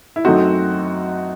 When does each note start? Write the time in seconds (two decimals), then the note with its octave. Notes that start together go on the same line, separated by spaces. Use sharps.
0.16 E4
0.25 F#2 F#3 A3 C4 D#4 F#4